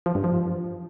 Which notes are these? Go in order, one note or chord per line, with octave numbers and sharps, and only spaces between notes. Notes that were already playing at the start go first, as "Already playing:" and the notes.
F3
G2
F3